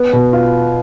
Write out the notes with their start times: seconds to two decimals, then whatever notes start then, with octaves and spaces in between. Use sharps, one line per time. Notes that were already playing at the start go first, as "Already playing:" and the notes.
Already playing: B3
0.13 B2
0.33 F4